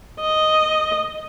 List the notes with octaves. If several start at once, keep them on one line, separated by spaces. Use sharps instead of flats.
D#5